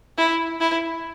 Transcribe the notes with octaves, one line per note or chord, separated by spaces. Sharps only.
E4
E4